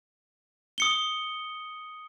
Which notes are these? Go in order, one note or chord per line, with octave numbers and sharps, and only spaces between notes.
D#6 C#7 G7